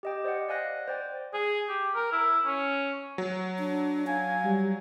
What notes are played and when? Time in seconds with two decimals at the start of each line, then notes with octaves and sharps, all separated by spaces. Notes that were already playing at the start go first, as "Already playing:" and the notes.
0.03 G4 D#5 G5
0.24 C5 D5 D#5 F#5
0.49 D5 F5 G#5 F#6 A#6
0.88 C5 D5 G5
1.33 G#4
1.69 G4
1.95 A#4
2.12 E4
2.46 C#4
3.18 F#3
3.59 D4
4.07 F5 G#5
4.45 G3